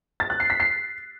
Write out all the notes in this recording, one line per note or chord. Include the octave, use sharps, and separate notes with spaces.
A6
F#6
C7
B6
C7